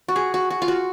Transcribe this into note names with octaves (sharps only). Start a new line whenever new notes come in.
F#4
G#4
F#4
F#4
F4
F#4